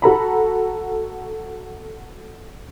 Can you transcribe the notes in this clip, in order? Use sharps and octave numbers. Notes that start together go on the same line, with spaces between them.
F#4 A4 A#5 B5